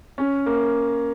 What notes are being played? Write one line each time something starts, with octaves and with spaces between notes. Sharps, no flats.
C#4
A#3